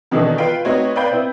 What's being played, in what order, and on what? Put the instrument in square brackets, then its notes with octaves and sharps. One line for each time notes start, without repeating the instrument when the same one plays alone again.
[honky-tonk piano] B2 D#3 E3 D4 D#4 A4
F4 B4 F5 G5
A3 C4 D#4 F#4 B4 C#5
B4 D5 F5 G5 B5 G6
B3 C4 E4